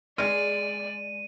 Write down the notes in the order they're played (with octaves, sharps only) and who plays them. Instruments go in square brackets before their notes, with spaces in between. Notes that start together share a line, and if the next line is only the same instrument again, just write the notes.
[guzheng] G#3 [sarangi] D5 [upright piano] F6 [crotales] D#7